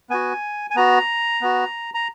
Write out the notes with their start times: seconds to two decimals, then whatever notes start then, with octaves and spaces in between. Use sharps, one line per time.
0.10 B3 F#4 G#5
0.71 G#5
0.75 B3 F#4 A#5
1.41 B3 F#4
1.94 A#5